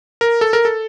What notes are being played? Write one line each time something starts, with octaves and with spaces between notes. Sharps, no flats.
A#4
A4
A#4
A4